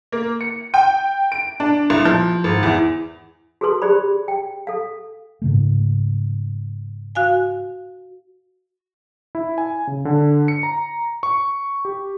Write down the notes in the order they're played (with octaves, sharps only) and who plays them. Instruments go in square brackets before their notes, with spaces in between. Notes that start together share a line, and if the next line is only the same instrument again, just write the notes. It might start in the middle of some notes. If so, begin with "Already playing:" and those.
[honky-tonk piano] A#3
C#7
G5
D7
D4
C2
F3
G#1
E2
[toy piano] F#4 G#4 A4 B4 C6
G4 G#4 C5 D5 B5
G5
A4 F5
[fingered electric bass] G#2 C#3 A3
[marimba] F#4 F5 G#5
[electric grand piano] E4
G#5
C#3
D3
C#7
A#5
C#6
G4